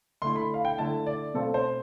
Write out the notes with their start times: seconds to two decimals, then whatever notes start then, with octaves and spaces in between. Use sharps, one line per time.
0.22 D3 A3 E4 C6
0.36 B5
0.54 F5
0.65 G5
0.78 D3 A3 E4 A5
1.06 D5
1.34 B2 A3 C4 F4 A4
1.54 C5